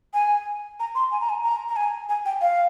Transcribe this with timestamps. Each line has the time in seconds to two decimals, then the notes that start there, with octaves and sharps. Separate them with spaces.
0.14 G#5
0.80 A#5
0.95 C6
1.12 G#5
1.21 A#5
1.29 G#5
1.44 A#5
1.69 A#5
1.76 G#5
2.09 G#5
2.26 G5
2.41 F5